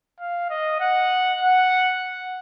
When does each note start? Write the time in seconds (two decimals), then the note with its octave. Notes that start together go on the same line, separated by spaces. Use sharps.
0.20 F5
0.50 D#5
0.80 F#5
1.41 F#5